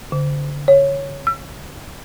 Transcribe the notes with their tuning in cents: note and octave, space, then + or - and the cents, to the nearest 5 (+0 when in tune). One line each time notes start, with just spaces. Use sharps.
D3 -30
C#5 -5
E6 +40